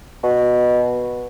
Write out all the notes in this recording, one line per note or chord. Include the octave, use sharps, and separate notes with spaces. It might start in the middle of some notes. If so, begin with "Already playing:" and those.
B2